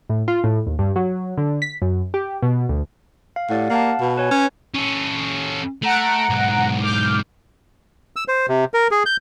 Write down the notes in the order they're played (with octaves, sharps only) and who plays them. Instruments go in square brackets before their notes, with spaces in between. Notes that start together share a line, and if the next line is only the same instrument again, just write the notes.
[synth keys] A2
F4
A2
D#2
G2
F#3
D3
B6
F#2
G4
B2
D2
[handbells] F5
[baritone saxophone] A2 [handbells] G4 D5 F#5
[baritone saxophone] A#3 [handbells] F5 F#5 A5
[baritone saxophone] B2
[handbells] B4 C#5 G#5
[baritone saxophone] C#4
[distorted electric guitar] C#4 A4
[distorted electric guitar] A3 [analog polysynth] F#5 A#5 D7
[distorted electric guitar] B1 G#2
[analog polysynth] D6 F6 G6
[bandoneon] E6
C5
C3
A#4
G#4
G6